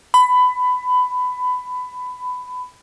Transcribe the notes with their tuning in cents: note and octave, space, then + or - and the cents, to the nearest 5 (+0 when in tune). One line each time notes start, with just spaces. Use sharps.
B5 +20